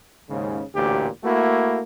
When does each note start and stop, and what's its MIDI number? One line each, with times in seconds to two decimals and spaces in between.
0.29 0.63 39
0.29 0.63 44
0.29 0.63 49
0.74 1.08 33
0.74 1.08 38
0.74 1.08 46
0.74 1.08 67
1.24 1.81 57
1.24 1.81 58
1.24 1.81 64
1.24 1.81 66